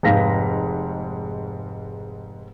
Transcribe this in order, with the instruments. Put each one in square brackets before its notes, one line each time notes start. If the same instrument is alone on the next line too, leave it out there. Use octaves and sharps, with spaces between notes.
[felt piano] F1 G#2 F5 A#6 B6